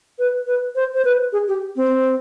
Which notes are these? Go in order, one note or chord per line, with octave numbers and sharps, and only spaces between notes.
B4
B4
C5
C5
B4
G#4
G4
C4